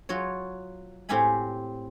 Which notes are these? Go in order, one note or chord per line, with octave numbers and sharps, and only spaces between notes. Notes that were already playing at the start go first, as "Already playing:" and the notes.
F#3 F4 C#5
A2 C4 G4 F5 G#5 B5